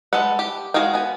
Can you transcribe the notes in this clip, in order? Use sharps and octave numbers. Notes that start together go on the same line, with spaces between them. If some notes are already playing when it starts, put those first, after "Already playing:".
G#3 A4 B4 F#5
G4
G#3 F#4 G#4 F5 G5
B3 G#5